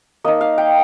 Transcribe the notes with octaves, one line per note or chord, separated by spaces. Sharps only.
A#3 D#4 D#5
F5
G5